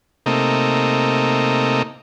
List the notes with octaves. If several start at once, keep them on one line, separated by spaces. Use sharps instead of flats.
C3 A3 A#3 D#4